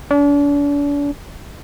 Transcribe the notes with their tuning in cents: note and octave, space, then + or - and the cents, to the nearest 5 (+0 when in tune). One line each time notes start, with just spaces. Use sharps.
D4 -40